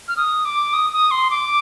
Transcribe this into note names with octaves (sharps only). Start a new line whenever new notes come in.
F6
D#6
D6
D#6
D#6
C6
D6